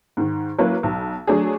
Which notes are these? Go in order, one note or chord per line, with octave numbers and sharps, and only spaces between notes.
G#2 D#3
F#3 A#3 C#4 E4 A#4 B4
B1
F#3 A3 D4 G#4